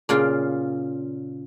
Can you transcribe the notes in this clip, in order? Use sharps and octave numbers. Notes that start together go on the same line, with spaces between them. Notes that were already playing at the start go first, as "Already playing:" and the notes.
A#2 C#3 F4